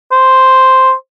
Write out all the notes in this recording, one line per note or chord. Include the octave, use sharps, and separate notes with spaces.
C5